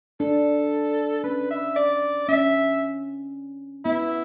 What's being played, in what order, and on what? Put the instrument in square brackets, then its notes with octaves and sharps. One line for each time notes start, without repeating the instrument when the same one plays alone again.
[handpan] D4 [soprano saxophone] A4
[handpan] C#4 [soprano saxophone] B4
[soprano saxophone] E5
D5
[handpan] C#4 [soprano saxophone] E5
[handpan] B3 [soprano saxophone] E4